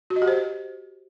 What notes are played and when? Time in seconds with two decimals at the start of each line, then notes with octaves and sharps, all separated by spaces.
0.10 F#4
0.16 D#5
0.22 G4
0.28 C5